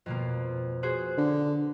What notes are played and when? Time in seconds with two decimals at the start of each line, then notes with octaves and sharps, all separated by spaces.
0.06 F2 B2 A#3
0.83 F#4 G#4 C5
1.18 D3